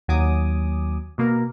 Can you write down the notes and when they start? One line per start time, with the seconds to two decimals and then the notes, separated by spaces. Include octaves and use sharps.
0.08 D#2 F#3 G#5 D6 D#6
1.18 B2 A#3 A#4